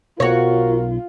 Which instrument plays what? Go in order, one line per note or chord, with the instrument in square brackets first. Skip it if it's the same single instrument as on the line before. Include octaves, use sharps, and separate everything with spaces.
[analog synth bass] B1 [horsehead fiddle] F4 [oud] F#4 C#5 [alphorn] A#4